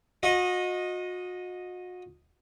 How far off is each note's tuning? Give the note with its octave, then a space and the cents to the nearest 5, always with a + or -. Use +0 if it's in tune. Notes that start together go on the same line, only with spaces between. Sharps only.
F#4 -40 D#5 +0